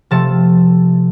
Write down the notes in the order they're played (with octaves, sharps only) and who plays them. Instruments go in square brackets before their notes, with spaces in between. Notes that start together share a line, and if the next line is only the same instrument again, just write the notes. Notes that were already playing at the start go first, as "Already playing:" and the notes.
[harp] C3 F3 A3 A5